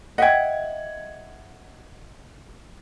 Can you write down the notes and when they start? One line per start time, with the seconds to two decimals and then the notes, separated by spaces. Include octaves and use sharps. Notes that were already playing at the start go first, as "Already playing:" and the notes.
0.18 D#5 E5 F#5 G5 G#6